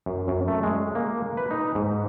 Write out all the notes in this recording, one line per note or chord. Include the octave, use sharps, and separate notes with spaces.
F#2
F#2
A3
G#3
A#3
B4
D#4
G#2